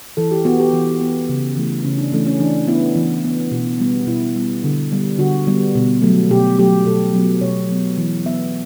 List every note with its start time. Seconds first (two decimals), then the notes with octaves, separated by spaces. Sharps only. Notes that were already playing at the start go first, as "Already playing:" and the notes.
0.17 E3 A4
0.31 G4
0.45 B3 F#4
0.60 G4
0.73 E3
1.01 B3
1.29 C#3
1.57 E3 A3
1.84 C#3 C#4
1.98 D4
2.12 E3 A3 C#4
2.27 C#4
2.40 E3 D4
2.67 B3 E4
2.95 E3
3.24 B3
3.52 B2
3.80 G3 B3
4.07 B2 E4
4.36 G3 B3
4.64 D3
4.91 G3 B3
5.18 D3 F#4
5.47 G3 B3
5.75 B2
6.02 F#3 A3
6.30 B2 G4
6.58 F#3 A3 G4
6.86 B2 A4
7.14 F#3 B3
7.41 B2 C#5
7.70 F#3 B3
7.97 E3
8.26 B3 E5